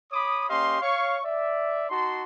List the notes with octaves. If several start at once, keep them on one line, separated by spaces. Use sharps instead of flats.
C#5 B5 D6 D#6
A#3 C#4 G4 D#5 F5 C6
C#5 F5 C#6
D5 E5
D#4 F#4 A5 C6